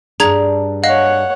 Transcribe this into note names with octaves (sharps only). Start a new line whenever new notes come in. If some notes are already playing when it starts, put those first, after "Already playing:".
G2 D4 G#4 A#5 G#6
C#5 D#5 F5 F#5